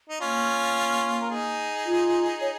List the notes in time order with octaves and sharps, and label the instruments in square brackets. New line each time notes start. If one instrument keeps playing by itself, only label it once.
[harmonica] D#4
[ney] A#3 [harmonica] C#4 F4
[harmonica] A#4
D#4 G#4
[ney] F4
C#5